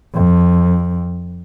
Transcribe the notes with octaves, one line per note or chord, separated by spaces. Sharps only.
F2